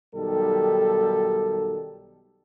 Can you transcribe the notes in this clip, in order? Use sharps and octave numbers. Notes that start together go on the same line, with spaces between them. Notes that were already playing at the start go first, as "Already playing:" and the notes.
B1 D#3 F#3 G3 G4 A4